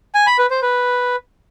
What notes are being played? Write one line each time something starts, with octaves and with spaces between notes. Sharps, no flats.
G#5
B5
B4
C5
B4